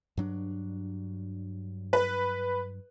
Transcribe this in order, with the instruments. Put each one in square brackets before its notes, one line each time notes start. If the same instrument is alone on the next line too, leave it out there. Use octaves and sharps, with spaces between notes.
[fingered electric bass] G2 F#3 D4
[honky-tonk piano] B4